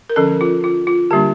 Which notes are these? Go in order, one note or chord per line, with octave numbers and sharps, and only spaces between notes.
A#4
D3 F3 C#4 A4
F4
F4
F4
D3 G3 A#3 D4 G4